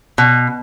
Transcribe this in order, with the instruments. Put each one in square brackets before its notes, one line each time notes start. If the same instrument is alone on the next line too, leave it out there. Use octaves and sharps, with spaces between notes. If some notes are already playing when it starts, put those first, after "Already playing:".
[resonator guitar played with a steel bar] B2